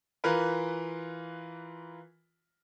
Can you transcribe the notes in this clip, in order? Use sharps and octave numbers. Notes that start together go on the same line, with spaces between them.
E3 F4 A#4 B4